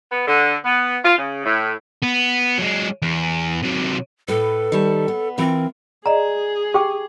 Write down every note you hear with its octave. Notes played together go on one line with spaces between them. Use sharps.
B3
D3
B3
F4
C#3
A2
B3
F#3 G#3
E2
C3 F#3
A2 A4 B4
D#3 G3 A5
B3
E3 C4 F4 A#4
G#4 D5 D#5 A#5
G4 G5 D6